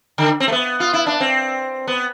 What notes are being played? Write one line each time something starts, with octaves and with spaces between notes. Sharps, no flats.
D3
C4
A3
B3
F4
E4
D4
C4
B3